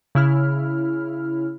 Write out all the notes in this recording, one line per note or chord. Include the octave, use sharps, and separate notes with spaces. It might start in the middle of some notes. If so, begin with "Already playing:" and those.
C#3 E4 F6